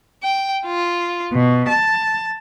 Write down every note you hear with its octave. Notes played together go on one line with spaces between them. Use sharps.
G5
F4
B2
A5